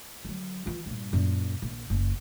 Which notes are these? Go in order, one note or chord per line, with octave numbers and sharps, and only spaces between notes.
D3 F#3
E3 F4
G2 A#2
F#2 A#2
A#1
F#1